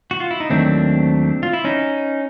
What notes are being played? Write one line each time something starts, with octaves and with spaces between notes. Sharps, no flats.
F#4
F4
E4
D#4
D#2 D#3 F#3 A3 C4 D4
F4
E4
C#4 D#4